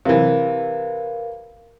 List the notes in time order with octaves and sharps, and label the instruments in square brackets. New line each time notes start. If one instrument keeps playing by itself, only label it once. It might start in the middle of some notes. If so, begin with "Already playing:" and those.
[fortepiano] C3 E3 [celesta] A#4 F5